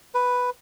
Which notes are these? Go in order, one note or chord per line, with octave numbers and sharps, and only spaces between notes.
B4